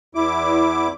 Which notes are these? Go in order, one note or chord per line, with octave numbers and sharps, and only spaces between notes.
E2 E4 D6